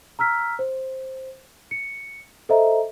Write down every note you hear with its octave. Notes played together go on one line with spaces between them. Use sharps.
A#5 E6 F6 B6
C5
C#7
A4 C5 D#5 E5 A#5